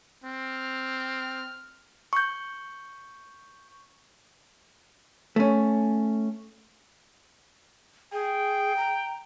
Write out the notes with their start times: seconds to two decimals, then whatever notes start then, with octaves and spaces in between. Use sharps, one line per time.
0.24 C4 F6
2.13 C#6 G6
5.36 A3 C#4
8.13 G#4 G5
8.77 A#5